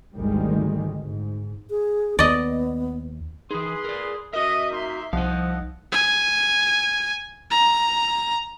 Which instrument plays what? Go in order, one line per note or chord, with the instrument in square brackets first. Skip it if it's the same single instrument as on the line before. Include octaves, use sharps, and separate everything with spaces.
[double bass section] G#1 D2 D#3 G3 G#3
G#2
[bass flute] G#4
[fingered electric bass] D#2 [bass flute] B3 [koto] D5 D#5
[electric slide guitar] E3 D#4 [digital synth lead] G#4 [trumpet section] B4 C6
[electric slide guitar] A#4 D5
[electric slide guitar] F#4 A#4 [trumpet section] D#5 [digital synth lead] E5
[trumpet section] A#3 D#4 C6
[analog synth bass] C2 [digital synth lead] F3 [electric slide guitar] D#4 F5 [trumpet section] D#5 F#5
[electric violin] G#5
A#5